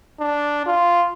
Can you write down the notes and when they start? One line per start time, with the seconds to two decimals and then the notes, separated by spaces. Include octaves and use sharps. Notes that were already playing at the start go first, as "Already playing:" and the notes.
0.20 D4
0.66 F4